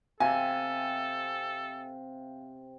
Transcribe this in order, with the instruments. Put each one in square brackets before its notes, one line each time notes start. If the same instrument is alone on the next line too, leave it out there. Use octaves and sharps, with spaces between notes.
[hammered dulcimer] C3 [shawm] A4 [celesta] F5 [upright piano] G#5